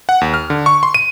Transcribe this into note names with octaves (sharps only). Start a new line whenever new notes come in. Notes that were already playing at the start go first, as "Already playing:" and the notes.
F#5
D#2
F6
D3
C#6
C6
D#7